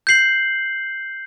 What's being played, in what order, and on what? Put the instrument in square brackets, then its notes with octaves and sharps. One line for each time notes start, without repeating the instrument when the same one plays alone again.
[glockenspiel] G6 C7 F#7